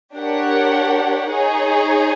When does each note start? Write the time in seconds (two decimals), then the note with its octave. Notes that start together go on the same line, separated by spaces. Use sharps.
0.16 D4 G4 A#4 C#5 F#5
1.29 D#4 G#4 C#5